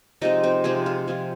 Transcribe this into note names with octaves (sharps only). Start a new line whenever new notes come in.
C3 F3 G#3 C4 D#4 D#5
C4 C5
C3 F3 G#3 C4 G#4
F4
F3 C4 F4 G#4